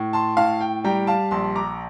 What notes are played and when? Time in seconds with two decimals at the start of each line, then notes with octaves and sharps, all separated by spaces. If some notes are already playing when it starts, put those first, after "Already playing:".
Already playing: A2
0.13 A5 C6
0.37 A2 F5 A5
0.61 G5
0.84 G3 G5 A#5
1.07 F5 A5
1.31 A#1 A5 C6
1.56 A#5 D6